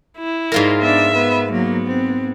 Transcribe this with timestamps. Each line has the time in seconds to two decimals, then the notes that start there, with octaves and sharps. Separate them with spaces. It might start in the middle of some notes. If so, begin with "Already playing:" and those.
0.18 E4
0.52 G#2 F4 A#4
0.81 B3 D4 E5
1.14 B3 B4
1.52 F#3 A#3 B3
1.87 C4